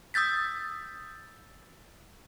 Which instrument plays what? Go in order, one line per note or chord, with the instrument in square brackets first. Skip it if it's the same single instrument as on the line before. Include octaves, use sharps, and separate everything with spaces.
[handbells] D#6 E6 G6 A6 B6